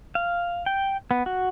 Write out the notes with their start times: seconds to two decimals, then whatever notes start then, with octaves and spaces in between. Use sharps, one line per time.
0.15 F5
0.66 G5
1.11 B3
1.26 F#4